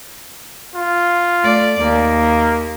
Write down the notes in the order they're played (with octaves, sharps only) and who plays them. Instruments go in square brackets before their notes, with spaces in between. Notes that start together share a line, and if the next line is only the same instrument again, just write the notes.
[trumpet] F4
[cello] A3 D5
[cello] D#2 [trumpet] A#3